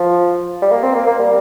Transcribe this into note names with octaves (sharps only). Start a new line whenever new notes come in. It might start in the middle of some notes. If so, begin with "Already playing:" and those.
Already playing: F3
G3
A#3
C4
A#3
A#3
G3